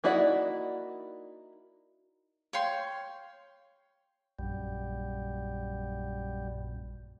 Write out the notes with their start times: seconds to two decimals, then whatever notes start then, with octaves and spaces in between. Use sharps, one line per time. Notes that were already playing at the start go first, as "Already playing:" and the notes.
0.04 A#3 D#4 E4 F#4 D5
2.53 C#5 F5 G5 C6
4.39 A#1 F#2 G3